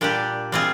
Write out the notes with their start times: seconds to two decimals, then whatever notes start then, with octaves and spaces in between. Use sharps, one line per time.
0.01 A#2 G3 D4 G4
0.52 G3 C4 F4 G#4